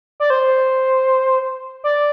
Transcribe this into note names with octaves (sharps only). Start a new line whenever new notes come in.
D5
C5
D5